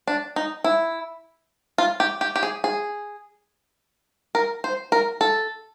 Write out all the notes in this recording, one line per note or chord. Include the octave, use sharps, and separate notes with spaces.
D4
D#4
E4
F4
G4
G4
G4
G#4
G#4
A#4
C5
A#4
A4